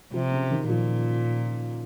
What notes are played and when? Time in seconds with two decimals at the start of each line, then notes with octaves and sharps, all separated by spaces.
0.13 C3 F3
0.31 C#3
0.51 D#3
0.69 A#2 F3